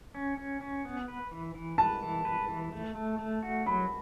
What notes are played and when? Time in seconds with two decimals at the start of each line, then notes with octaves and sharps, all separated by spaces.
0.15 C#4
0.37 C#4
0.61 C#4
0.85 B3
1.08 B4
1.32 E3
1.55 E3
1.78 B4 A5
2.03 E3
2.25 B4
2.49 E3
2.72 A3
2.95 A3
3.19 A3
3.43 F#4
3.66 F#3 B5